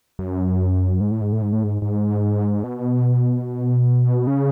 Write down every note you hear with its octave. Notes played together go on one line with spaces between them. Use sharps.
F#2
G#2
A2
G#2
A2
G#2
A2
G#2
G#2
B2
C#3